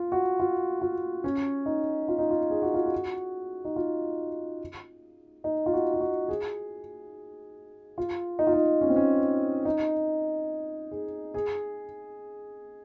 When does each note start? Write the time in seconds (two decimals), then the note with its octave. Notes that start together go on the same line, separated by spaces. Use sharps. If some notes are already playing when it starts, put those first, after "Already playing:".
Already playing: F4
0.12 F#4
0.39 F4
0.81 F4
1.24 C#4
1.66 D#4
2.08 F4
2.19 D#4
2.31 F4
2.50 G#4
2.62 F#4
2.74 F4
2.86 F#4
3.65 D#4
3.76 F4
5.44 D#4
5.66 F4
5.73 F#4
5.94 F4
6.01 F#4
6.29 G#4
7.98 F4
8.39 D#4
8.47 F4
8.53 D#4
8.81 C#4
8.89 C4
8.96 C#4
9.65 D#4
10.91 G#4
11.34 G#4